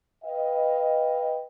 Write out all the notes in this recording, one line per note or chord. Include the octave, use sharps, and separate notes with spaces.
B4 D#5 F5 G5